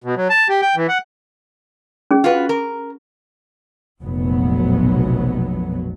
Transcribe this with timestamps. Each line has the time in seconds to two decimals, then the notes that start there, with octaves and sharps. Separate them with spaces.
0.04 B2
0.17 F#3
0.30 A5
0.49 G4
0.61 G5
0.76 E3
0.89 F#5
2.11 C#4 G#4
2.24 F4 F#4 B4
2.49 A#4
4.01 F1 A#1 B2 F#3 B3